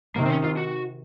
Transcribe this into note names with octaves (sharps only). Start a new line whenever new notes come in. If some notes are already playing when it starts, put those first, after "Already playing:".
C3 D#3 A#3
C4
C#4
F4
F#4